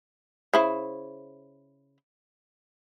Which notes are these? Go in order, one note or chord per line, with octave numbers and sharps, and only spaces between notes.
C#3 E4 C5